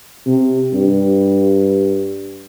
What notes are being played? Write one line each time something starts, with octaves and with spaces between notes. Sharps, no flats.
C3
G2